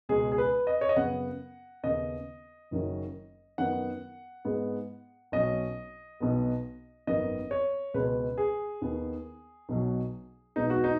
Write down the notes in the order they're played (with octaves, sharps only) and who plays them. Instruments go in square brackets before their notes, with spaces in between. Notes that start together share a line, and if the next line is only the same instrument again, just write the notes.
[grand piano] C#2 B2 G#3 G#4
G#4
B4
D#5
C#5
D#5
F#2 C#3 B3 F#5
D#2 C#3 B3 D#5
F#1 F#2 D#3 F#3 C#4
F#2 D#3 B3 F#5
G#2 G#3 B3
B1 B2 F#3 C#4 D#5
B1 B2 B3
G#1 F#2 D#3 B3 D#5
C#5
C#2 B2 G#3 B4
G#4
D#2 D#3 B3
B1 B2 F#3
B1 B2 G#3 B3 D#4
F#4
D#4